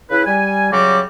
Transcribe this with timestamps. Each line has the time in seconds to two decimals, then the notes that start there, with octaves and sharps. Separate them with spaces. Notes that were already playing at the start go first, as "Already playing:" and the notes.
0.10 C#3 E4 B4
0.26 G3 G#5
0.71 C#3 F#3 G3 F#4 D6